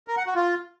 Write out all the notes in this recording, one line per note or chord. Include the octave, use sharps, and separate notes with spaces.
A#4
F#5
F#4
F4